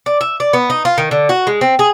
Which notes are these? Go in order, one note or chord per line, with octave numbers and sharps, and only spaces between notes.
D5
E5
D5
B3
D#4
F4
D#3
D3
F#4
G#3
C4
G#4